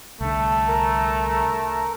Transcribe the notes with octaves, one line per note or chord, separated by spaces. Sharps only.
C2 D3 A3
A#4 A#5